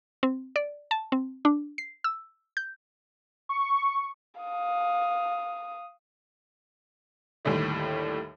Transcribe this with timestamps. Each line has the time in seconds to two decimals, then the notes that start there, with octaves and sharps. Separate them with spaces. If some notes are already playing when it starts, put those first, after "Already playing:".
0.23 C4
0.56 D5
0.91 A5
1.12 C4
1.45 D4
1.78 C7
2.04 E6
2.57 G6
3.49 C#6
4.41 F5 D#6
7.45 D#2 A2 D3 G3 A3